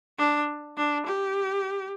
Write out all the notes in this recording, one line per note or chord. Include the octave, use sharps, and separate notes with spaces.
D4
D4
G4